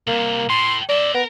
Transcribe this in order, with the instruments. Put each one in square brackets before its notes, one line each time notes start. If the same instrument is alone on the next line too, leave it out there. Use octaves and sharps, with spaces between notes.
[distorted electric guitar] C2 C3 [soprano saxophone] A#3
[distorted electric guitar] A2 [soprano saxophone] C6
[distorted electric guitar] A#4 E5 [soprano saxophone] D5
[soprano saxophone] B3 [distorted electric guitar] A#4